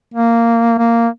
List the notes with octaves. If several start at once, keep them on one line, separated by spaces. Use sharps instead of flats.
A#3
A#3